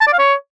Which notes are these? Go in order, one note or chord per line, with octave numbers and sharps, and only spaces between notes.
A5
D5
F5
C#5